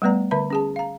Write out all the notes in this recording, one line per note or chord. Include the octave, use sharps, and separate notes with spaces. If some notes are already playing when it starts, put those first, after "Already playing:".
G3 A3 B3 B4 D5 A#5
D3 B4 E5 B5
C#4 G#4 A5
F5 A#5